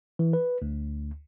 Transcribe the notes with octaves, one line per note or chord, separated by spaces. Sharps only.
E3
B4
D2